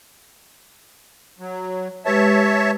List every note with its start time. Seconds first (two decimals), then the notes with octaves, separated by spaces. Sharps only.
1.39 F#3
2.06 G#3 G4 B4 C#5 E5 A5